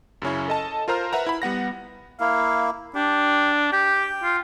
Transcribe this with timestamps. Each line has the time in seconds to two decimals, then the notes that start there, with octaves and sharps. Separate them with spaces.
0.22 F#2 C#3 C#4 E4
0.48 A4 D#5 A5
0.88 F4 A#4 C5 A#5 F6
1.13 B4 E5 F#5 A#5
1.26 E4 B5
1.42 G3 B3 F#5 A#6
2.20 A#3 E4 F5
2.95 D4 G4
3.72 G4 G5
4.24 F4